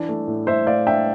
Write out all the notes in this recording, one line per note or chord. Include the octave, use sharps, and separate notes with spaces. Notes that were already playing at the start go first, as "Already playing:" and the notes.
Already playing: E3 D4
A3
A2
A2 C5 E5
A2 D5 F5
D4 E5 G5